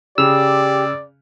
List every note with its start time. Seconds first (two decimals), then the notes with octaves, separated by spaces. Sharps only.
0.18 C#3 G4 D5 E6 F7